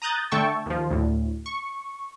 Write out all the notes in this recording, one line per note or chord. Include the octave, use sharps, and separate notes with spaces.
A#5 D#6 F#6 G6 A6
D3 A3 G5 A5 C#6 E6
D#2 F3
D2 A2
C#6